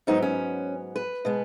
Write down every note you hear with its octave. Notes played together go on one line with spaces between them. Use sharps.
G#2 F#3 B3 D#4
C#4
B4
B2 G#3 B3